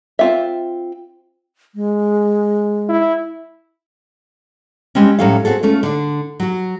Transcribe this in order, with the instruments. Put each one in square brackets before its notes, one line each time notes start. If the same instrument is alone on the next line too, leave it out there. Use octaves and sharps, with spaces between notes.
[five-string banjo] C4 F4 E5
[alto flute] G#3
[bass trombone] E4
[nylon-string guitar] G3 G#3 C4 C#4
A2 F#3 G3 C#4 A4 F5
C4 D4 F#4 G#4 A4
A3 C#4 F4
D3 D4
F#3 F#4